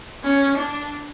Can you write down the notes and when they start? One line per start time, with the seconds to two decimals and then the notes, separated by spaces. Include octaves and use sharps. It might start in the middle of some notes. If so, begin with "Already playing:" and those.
0.24 C#4
0.57 D4